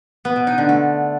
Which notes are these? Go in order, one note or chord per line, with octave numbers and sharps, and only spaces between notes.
B3
B2
D#4
D3
A3